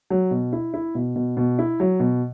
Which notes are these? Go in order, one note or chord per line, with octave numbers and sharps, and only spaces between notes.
F#3
B2
E4
E4
B2
B2
B2
E4
F#3
B2